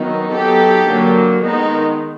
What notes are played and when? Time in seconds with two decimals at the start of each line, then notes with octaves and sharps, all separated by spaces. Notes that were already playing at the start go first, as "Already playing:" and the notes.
Already playing: D#3 F#3 B3 D#4
0.32 F#3 B3 D#4 G4 A4
0.87 D3 F#3 A#3
1.42 D#3 G#3 B3 D#4